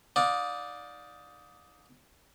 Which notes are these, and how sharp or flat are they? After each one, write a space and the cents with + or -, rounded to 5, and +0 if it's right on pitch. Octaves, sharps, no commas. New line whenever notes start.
D#4 +10 D5 +0 F5 +40